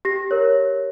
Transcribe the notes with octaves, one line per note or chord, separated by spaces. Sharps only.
G4 A#6
A#4 C#5